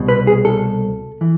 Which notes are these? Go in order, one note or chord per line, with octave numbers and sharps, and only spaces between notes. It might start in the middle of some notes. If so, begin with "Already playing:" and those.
Already playing: C2 B2
B4
G#4
A4
E3